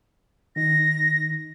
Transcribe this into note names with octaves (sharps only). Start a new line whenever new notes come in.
D#3 D#4 A#6